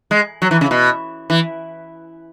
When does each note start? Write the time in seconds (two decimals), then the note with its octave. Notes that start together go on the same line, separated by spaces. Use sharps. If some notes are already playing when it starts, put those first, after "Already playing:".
0.11 G#3
0.42 F#3
0.51 E3
0.61 C#3
0.71 B2
1.30 E3